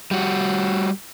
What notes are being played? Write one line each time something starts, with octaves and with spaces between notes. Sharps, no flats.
G3 F#4